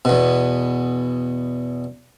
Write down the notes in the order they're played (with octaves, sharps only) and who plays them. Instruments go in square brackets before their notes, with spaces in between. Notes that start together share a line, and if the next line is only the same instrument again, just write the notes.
[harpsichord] E2 B2